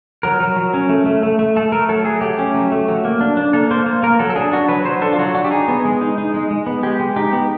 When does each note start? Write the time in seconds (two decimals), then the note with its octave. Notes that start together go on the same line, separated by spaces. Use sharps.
0.23 F#3 A#4
0.40 F#3
0.56 F#3
0.74 C#4
0.89 A3
1.06 A3
1.23 A3
1.39 A3
1.56 A3 A4
1.72 A3 A#4
1.89 F#3 A4
2.05 F#3 G#4
2.21 A3 G4
2.39 C#4
2.55 F#3
2.72 A3
2.88 F#3
3.05 A#3
3.21 D4
3.37 D4
3.53 A#3 A4
3.71 A#3 C5
3.86 A#3
4.03 A#3 A#4
4.19 F#3 A4
4.30 A4
4.36 D4 G#4
4.52 D4 F#4
4.69 F#3 B4
4.85 F#3 C5
5.02 D4 A4
5.13 F4
5.18 F#3 F#4
5.34 D4 F#4
5.44 G4
5.51 D#4 G#4
5.68 B3
5.85 G#3
6.01 D#4
6.18 D#4
6.34 G#3
6.51 G#3
6.66 B3
6.83 G#3 G4
7.00 G#3
7.16 D#4 G4
7.33 B3